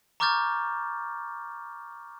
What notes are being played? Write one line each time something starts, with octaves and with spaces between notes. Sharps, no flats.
A#5 C#6 D6 F6 G6 A6